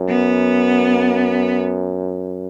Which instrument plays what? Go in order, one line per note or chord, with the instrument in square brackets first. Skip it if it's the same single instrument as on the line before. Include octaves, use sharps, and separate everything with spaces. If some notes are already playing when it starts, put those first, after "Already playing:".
Already playing: [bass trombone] F#2
[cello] B3